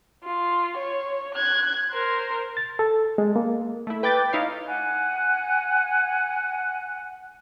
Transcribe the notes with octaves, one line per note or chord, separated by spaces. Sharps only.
F4
C#5
F#6 G#6
A#4 C5
A6
A4
G#3
A#3
A3 E4
B4 G5 D6 G6 A6
D#4 E4 C#5 F5
F#5 G#5 F#6